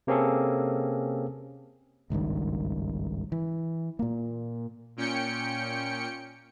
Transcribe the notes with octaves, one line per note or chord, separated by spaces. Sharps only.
C3 A#3 C4 C#4 G#4 A4
G#1 C#2 G2 D#3
E3
A#2 A#3
A#2 C#4 G5 C#7